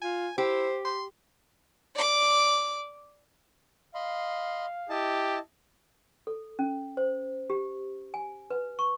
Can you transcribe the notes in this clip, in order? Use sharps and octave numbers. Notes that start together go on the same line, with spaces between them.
F4 G#5
E4 G4 C5
C6
D5 D6
D#5 F5 B5 C6
E4 G4 D#5 A5
A4
C#4
C5
G4
G#5
B4
C#6